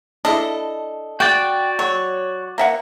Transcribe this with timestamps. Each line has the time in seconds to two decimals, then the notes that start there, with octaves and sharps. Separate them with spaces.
0.25 D4 E4 A4 D#5
1.20 F#4 D5 G5
1.79 F#3 C#5
2.58 A#3 E5 F#5